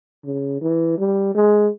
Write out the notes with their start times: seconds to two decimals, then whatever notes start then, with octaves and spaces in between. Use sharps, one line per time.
0.25 C#3
0.62 E3
0.98 G3
1.35 G#3